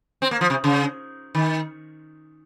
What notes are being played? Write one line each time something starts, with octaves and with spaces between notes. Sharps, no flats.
C4
A#3
F3
C3
C#3
D#3